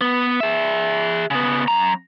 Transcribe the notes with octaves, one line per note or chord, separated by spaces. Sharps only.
B3
G#4 E5
C#3 B3
F#2 A#5